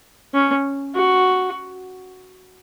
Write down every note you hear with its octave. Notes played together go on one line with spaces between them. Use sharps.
C#4
F#4